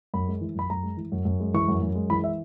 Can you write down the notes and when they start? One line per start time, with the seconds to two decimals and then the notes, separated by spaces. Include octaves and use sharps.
0.14 F#2 B5
0.28 G#3
0.41 E3
0.55 F#2 B5
0.70 F#2 A#5
0.83 G#3
0.97 E3
1.12 F#2
1.25 F#2
1.40 G#3
1.54 E3 C#6
1.68 F#2
1.82 F#2
1.95 G#3
2.10 E3 B5
2.24 E5